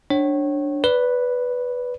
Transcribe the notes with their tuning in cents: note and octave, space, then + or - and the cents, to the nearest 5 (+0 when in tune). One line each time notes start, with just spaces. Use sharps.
D4 +0 C#5 -25 G5 -45
B4 +0 D5 -25